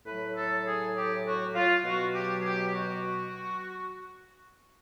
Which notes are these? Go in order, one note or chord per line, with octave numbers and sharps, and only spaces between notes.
A2 F#3 B4
A4
G#4
G4
F#4
F4
B2 F#3 F#4
G4
G#4
G4
G4
F#4